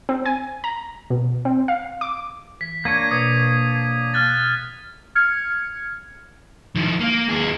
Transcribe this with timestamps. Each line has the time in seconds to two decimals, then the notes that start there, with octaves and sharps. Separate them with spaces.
0.09 C4
0.26 G#5
0.64 A#5
1.10 B2
1.45 C4
1.68 F5
2.01 D6
2.61 E3 B6
2.85 A#3 D4 C#5 G#6 D#7
3.11 B2 D#6
4.14 F6 F#6 A6
5.15 F6 G#6 C#7
6.76 D#3 F3
7.01 A#3
7.29 D#2 G#4